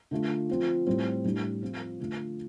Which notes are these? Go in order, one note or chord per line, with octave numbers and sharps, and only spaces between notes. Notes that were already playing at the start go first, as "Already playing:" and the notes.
D3 A3 F4
F3 C4 F4
A2 G3 C4
A2 G3 D4
F3 C4 F4
D3 A3 F4